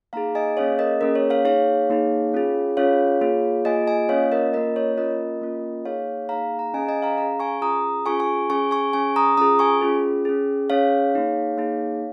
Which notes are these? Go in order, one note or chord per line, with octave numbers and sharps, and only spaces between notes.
A#3 D#4 G#4 F5 A#5
D#5 G#5
A#3 C#4 G#4 C#5 F5
A#4 D#5
A#3 C#4 G#4 A#4
C#5
C#5 F5
A#3 D#4 G#4 C#5 F5
A#3 D#4 G#4
C#4 F4 G#4
C#4 F4 G#4 C#5 F5
A#3 F4 G#4
A#3 F4 G#4 D#5 G#5
D#5 G#5
A#3 C#4 F4 C#5 F5
A#4 D#5
A#3 C#4 F4 A#4 D#5
C#5
A#3 C#4 F4 A#4 D#5
A#3 C#4 F4
A#3 D#4 G#4 C#5 F5
A#3 D#4 G#4 F5 A#5
F5 A#5
C#4 G#4 D#5 G#5
D#5 G#5
F5 A#5
C#4 G#4 F5 A#5
G#5 C#6
C#4 F4 G#4 A#5 D#6
C#4 F4 G#4 G#5 C#6
G#5 C#6
C#4 G#4 G#5 C#6
G#5 C#6
C#4 G#4 G#5 C#6
A#5 D#6
C#4 F4 G#4 A#5 D#6
G#5 C#6
C#4 F4 G#4
C#4 G#4
C#4 G#4 C#5 F5
A#3 D#4 G#4
A#3 D#4 G#4